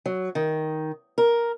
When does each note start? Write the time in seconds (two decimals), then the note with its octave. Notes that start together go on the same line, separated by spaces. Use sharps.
0.06 F#3
0.35 D#3
1.18 A#4